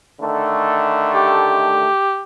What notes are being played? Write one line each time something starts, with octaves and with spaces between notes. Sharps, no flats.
D3 D#3 A3
G4